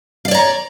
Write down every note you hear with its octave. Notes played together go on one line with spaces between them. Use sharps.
C#5 D5 F5 A#5